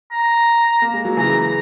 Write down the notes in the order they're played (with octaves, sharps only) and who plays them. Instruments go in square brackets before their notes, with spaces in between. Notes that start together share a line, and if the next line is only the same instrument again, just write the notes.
[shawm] A#5
[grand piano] A#3
G#3
F#3
[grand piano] C#3 E3 [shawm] A#5
[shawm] A#5